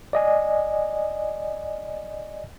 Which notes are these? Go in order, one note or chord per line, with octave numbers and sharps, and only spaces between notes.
D5 D#5 G#5